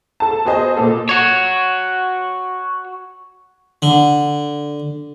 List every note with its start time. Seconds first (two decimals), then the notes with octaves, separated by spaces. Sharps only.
0.20 A4 A5
0.45 B3 F#4 G#4 C5 D#5
0.77 A#2 A4
1.09 F#4 C#5
3.82 D3